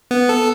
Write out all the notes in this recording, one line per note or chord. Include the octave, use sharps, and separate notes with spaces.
B3
A4